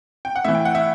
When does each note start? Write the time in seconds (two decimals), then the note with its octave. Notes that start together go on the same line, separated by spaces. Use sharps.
0.25 G5
0.36 F#5
0.45 A2 E3 E5
0.55 G5
0.65 F#5
0.75 E5